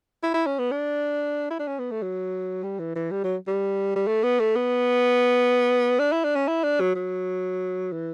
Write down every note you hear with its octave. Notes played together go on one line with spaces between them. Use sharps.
E4
E4
C#4
B3
D4
E4
D4
C#4
B3
A3
F#3
G3
E3
E3
G3
F#3
G3
G3
A3
B3
A3
B3
D4
E4
D4
C#4
E4
D4
F#3
F#3
E3